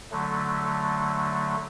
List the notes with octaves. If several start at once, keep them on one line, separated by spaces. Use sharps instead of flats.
D3 F#3 A3